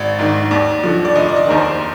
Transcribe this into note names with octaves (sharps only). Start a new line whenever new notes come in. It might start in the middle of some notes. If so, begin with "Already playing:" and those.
Already playing: G#1 D5
G#2 D#3
D#2 D5
D3 F3
D5
F1 D#5
D5
D#5
D#2 D#3 A#4
C5